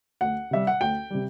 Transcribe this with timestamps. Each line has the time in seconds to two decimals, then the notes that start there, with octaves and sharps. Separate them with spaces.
0.21 D2 F#5
0.51 C3 G3 E5
0.67 F#5
0.81 D2 G5
1.10 C3 G3